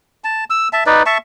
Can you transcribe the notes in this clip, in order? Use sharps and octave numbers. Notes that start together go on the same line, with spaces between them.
A5
E6
E5 A5
D#4 B4 D5
E5 A5 C#6